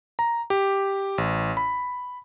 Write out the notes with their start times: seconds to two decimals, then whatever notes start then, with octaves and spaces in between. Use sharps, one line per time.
0.19 A#5
0.50 G4
1.18 A1
1.57 B5